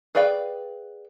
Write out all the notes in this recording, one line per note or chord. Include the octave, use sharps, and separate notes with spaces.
G#4 B4 D5 F5 G5